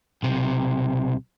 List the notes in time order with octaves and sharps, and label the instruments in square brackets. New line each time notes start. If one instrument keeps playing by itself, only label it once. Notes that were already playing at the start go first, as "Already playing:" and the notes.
[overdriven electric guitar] B1 C3